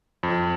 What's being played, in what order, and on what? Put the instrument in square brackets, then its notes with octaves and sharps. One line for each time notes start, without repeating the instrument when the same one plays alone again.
[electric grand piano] F2